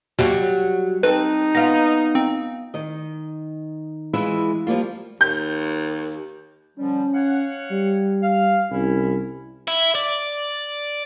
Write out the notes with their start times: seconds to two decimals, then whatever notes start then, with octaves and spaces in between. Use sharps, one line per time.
0.19 D#2 B2 F#3 G3
1.03 C4 D#4 A4 B4
1.55 B3 F4 A#6
2.15 C4
2.74 D#3 D#5
4.13 E3 G#3 E4 F4
4.67 F3 G3 A#3 F4
5.21 D#2 G6
6.77 D3 F3 G3 C#4
7.15 C#5 F5 F#5
7.71 G3
8.23 F5
8.71 C2 C#4 E4
9.68 E4
9.95 D5